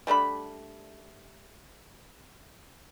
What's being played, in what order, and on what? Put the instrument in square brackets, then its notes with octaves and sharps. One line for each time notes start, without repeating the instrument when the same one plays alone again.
[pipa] G3 A3 D4 B5